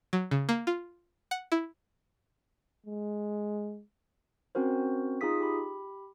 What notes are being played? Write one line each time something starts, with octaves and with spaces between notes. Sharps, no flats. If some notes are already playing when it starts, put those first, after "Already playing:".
F#3
C#3
A#3
F4
F#5
E4
G#3
C4 C#4 F#4 A#4 C5
D#4 F4 G#4 F5 D#6 B6
G4 B5